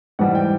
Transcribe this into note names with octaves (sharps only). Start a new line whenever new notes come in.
G#2 E3 G3 F#5
G5